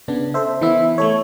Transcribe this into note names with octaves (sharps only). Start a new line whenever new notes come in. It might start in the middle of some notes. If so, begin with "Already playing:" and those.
C#3 B3 D4
A4 C5 E5
E3 B3 E4 E5
A3 A4 C#5